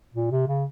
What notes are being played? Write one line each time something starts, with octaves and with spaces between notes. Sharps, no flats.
A#2
C3
C#3